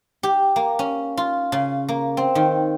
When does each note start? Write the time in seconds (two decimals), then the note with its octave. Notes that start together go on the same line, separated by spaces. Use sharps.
0.23 G4
0.56 A#3
0.79 C#4
1.17 F4
1.52 C#3
1.88 A#3
2.17 C4
2.35 D#3